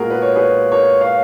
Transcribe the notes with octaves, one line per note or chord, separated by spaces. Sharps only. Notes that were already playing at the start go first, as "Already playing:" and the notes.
Already playing: A#2 G#3 B3 F4 F#4 G#4 A#4
B4
C#5
G#4 B4
A#4 C#5
C#5 F5